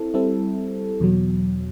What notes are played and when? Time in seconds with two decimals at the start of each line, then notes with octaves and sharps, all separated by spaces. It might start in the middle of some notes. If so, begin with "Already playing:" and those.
Already playing: C4 E4 A4
0.14 G3 C4 E4 A4
1.00 E2 B2 F#3